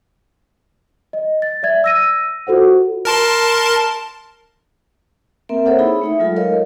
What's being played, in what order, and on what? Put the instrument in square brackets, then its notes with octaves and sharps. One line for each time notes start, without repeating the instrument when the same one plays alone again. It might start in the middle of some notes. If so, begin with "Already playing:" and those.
[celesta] D#5
A6
D5 E5 G#6
E6 A#6 D#7
F4 F#4 A4 C5 F#5
[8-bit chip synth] A#4 A5 C6
[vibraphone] A#3 C4 A#4 E5
A4 C5 C#5 E5 F#5
D#4 E4 G#4 B5
A3 D#4 E5
F#3 G#3 F4 A4
A4 A#4 C#5 D#5 F5